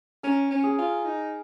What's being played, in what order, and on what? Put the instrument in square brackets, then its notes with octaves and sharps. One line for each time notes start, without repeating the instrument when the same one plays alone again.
[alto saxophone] C#4 [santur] A#4
[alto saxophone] C#4
[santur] G#4
[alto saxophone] F4
D#4